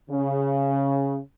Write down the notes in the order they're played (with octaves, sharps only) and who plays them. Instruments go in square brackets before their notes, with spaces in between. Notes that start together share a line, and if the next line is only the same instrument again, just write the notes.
[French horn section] C#3